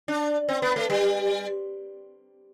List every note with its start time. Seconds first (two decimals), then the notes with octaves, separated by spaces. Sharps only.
0.08 D4
0.49 C4
0.62 B3
0.76 A3
0.90 G3